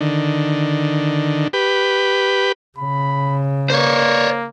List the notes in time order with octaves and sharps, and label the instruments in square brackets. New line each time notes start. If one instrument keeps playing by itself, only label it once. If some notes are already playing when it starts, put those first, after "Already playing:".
[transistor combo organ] D3 D#3
G4 B4
[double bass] C#3 [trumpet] B5
[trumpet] A#3 [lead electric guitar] C5 C#5